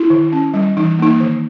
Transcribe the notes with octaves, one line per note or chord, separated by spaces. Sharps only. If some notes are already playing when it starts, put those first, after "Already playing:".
Already playing: E4
D#3
C#4
G3
E3 D#4
A#3 D#4
D#3